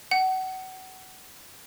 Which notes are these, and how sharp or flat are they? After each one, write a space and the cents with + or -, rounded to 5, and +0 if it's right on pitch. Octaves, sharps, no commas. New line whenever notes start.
F#5 +25